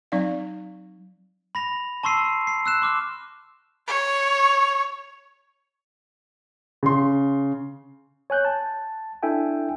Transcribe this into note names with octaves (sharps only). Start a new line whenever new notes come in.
F#3 C4 D#4 D5 F5
B5 A#6 F7
A5 C6 C#6 E6 C7 D#7
C7
E6 F#6 E7
C6 D6 F6
C#5
C#3 C6
C#5 G#5 F#6 G6
A5
D4 E4 A4 E5 G5 G#5